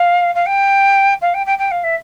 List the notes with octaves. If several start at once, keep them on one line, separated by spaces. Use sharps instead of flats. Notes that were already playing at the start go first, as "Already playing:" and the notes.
Already playing: F5
F5
G5
F5
G5
G5
G5
F5
E5